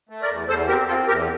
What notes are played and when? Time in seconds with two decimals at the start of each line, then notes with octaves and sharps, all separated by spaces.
0.09 A3
0.22 A#4 D5
0.28 E2
0.48 E2 A4 C5
0.68 C4 G4 A#4
0.87 C4 F4 A4
1.07 E2 G4 A#4